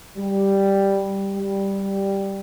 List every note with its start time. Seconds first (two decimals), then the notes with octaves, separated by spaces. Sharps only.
0.17 G3
1.36 G3